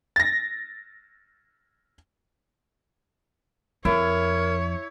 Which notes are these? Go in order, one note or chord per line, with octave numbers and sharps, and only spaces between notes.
A6 A#6
F2 E4 A#4 C#5